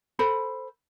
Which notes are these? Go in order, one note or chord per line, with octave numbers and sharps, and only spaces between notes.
A4 C5 B5